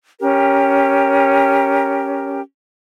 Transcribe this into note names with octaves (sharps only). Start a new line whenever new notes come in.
C#4 G4 A#4